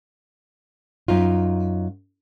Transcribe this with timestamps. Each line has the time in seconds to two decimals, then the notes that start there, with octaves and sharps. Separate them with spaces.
1.08 F#2 D#4 F4